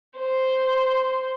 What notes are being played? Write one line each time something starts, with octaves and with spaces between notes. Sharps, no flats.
C5